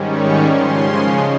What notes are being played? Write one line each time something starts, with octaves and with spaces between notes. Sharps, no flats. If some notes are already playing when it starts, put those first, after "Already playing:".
Already playing: G#2 D#3 G3 C#4
C#6
C#3 F3 G#3 C#4 C6